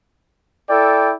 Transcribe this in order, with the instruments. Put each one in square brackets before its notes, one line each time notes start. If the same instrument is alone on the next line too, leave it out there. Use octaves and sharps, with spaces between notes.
[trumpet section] E4 A4 D5 G5